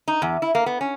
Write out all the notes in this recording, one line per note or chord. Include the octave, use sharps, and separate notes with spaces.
D#4
E2
E4
A#3
B3
C#4